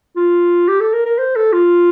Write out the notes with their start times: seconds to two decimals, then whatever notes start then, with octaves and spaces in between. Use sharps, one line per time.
0.16 F4
0.68 G4
0.80 A4
0.93 A#4
1.06 A#4
1.18 C5
1.36 A4
1.52 F4